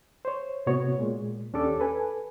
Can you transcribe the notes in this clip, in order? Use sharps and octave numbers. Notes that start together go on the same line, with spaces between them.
C5 C#5
A2 C3 B3 F#4 C#5
A#2 G#3
D#2 C#4 D4 G4 A4 D6
A4 B4 G#5